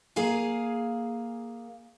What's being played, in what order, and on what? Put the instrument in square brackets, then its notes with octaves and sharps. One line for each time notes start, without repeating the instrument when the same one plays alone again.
[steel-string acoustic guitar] A#3 G#4 F5 G#5